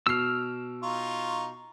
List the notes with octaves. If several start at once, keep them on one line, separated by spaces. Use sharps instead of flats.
B2 E6 F6 C7
D#4 F4 C#6